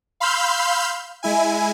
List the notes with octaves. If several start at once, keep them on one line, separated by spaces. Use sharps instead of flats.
F5 B5 C6 E6 F6 G6
G#3 E4 G#5